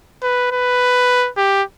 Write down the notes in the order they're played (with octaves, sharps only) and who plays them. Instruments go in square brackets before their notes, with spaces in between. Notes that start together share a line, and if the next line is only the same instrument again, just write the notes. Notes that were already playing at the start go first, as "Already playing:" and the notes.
[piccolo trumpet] B4
B4
G4